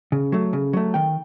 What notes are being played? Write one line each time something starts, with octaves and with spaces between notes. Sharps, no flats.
C#3
F#3 A3
C#3
F#3 A3
D#3 G5